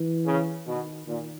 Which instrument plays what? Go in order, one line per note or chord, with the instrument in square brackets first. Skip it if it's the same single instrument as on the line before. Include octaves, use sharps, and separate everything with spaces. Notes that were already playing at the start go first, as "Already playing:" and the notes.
Already playing: [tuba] E3
[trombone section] C#3
[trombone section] B2 [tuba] D#3
[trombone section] A#2 [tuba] D#3